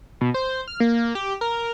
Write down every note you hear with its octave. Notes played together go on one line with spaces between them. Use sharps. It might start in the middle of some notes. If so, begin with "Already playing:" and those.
B2
C5
F6
A#3
G4
A#4